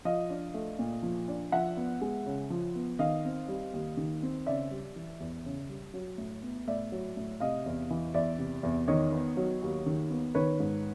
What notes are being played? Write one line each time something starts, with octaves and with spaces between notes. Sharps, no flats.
F3 D#5 F5
D4
A3
A#2
F3
D4
F3 E5 F#5
B3
G#3
C#3
F3
B3
D#3 D#5 F5
C4
G3
D#2
D#3
C4
C#3 D5 E5
G3
E3
E2
C#3
G3
F#3
A2
B3
A2 D5 E5
F#3
A2
C3 D#5 F5
E2
E3
E2 D5 E5
C3
E2
D#3 C#5 D#5
B3
F#3
D#2
D#3
B3
D#3 B4 C#5
G#2